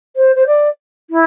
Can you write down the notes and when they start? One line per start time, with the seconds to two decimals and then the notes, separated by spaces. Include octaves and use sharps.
0.16 C5
0.35 C5
0.46 D5
1.10 E4